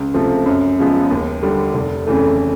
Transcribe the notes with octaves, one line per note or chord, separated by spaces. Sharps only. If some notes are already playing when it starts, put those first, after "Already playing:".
Already playing: C#2
C3 F3 A3 C4
F#2
C#3 F3 G#3 B3
D#2
D3 G3
F1
F2 C#3 E3 A3